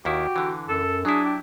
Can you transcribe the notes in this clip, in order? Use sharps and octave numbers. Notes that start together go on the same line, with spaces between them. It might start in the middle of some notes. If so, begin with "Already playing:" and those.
D#2 D#3 E4 F#4 G4
D3 E3
F#2 A4
F#3 D4 E4 G#4
G4